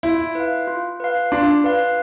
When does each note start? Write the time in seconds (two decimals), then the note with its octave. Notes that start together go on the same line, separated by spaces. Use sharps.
0.03 E4 F4
0.35 B4 F5
0.67 F4
1.00 B4 F5
1.32 D4 F4
1.64 B4 F5